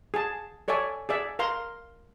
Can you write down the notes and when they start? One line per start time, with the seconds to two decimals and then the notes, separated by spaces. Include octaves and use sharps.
0.14 G#4 A5
0.68 A4 C#5 D5 E5 G#5
1.09 G#4 D5 E5
1.39 A#4 F5 A#5 C6